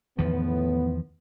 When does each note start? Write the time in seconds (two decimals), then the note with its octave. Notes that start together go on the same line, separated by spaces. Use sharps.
0.18 E2 A2 D#3 F3 B3